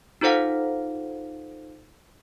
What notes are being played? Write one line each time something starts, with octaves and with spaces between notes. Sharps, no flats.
D#4 F4 A4 C5 F5 F#5